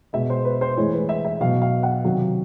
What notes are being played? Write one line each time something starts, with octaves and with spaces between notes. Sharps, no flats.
B2 G#3 E5
C5
B4
C5
A2 E3 G#3 C#5
B4
E5
E5
B2 F#3 F5
F5
F#5
C3 D#3 F#3